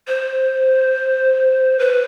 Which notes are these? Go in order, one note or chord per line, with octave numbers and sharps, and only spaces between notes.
C5
B4